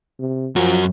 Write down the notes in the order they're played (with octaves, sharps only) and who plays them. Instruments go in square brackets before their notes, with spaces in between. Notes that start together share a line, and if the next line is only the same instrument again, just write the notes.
[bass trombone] C3
[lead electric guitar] F#2 F#4 [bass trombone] F3